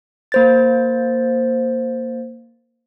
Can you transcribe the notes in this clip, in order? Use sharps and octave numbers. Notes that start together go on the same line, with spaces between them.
A#3 C5 A6